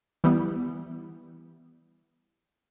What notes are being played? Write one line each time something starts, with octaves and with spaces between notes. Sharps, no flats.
E3 G3 B3